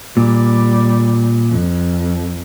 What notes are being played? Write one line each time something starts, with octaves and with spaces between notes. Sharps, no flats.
A#2 G3
F2